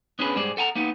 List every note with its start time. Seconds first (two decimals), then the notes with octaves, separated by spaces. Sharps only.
0.19 B3 C#4 D4 G#4 A4 B4
0.36 G#2 G3 G#4 C5 D5
0.57 A4 F#5 G#5 A#5
0.75 A#3 B3 D#4